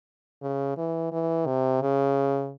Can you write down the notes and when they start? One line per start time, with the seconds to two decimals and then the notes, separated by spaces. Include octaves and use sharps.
0.42 C#3
0.77 E3
1.12 E3
1.46 C3
1.81 C#3